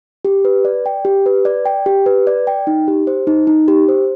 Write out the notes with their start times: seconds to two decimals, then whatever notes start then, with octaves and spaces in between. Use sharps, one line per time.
0.25 G4
0.45 B4
0.65 D5
0.86 G5
1.05 G4
1.26 B4
1.45 D5
1.65 G5
1.86 G4
2.06 B4
2.27 D5
2.47 G5
2.67 D#4
2.88 G4
3.07 C5
3.27 D#4
3.47 D#4
3.68 G4
3.89 C5